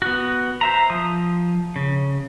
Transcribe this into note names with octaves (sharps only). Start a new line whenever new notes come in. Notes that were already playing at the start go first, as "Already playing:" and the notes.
B3 F#4
C5 E5 A#5
F3 D#6
C#3